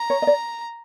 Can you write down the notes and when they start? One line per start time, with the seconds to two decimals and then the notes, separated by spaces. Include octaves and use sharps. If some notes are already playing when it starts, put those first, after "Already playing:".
Already playing: A#5
0.10 C#5
0.22 D#5
0.27 D5